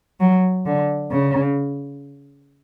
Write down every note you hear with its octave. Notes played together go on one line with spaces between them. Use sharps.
F#3
D3
C#3